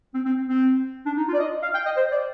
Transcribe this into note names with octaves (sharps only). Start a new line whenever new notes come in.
C4
C4
C4
D4
D#4
F4
D5
D#5
F5
G5
D#5
C5
D5